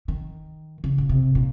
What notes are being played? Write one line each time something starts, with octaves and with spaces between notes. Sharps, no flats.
D#3
C#3
A#2
C3
A#2